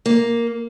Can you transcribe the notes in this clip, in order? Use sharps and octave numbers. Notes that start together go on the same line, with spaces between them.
A#3